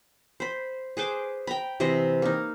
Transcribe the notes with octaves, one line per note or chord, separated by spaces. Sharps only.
C5 B5
G#4 B4 C5 D6
G5 A#5 B5
C3 E3 C5 D#5
A#3 D#4